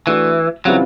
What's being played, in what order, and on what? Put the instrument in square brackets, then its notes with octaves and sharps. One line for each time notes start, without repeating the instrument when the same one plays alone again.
[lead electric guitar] E3 [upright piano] A3 D4 F#4
[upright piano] C#3 E3 G3 C4 F4 [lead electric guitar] F#3